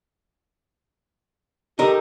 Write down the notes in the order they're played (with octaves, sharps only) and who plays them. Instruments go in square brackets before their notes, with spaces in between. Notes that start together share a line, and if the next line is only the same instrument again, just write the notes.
[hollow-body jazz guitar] D#4 A4 A#4 [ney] G4